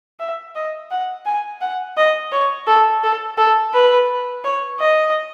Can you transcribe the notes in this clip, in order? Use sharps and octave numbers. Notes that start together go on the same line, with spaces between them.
E5
D#5
F#5
G#5
F#5
D#5
C#5
A4
A4
A4
B4
C#5
D#5